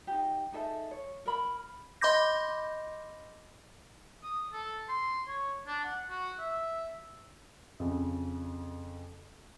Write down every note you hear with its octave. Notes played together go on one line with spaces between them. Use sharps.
D#4 G4
D#4 G#4 A4 E5
C#5
A#4 B5
D#5 B5 C6 D6 G6 A#6
D#6
A4
C6
C#5
D4
F#5
F#4
E5
F2 C#3